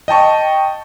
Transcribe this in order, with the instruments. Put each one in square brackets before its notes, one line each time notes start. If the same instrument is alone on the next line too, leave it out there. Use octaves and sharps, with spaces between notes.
[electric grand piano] D#5 G5 A5 C#6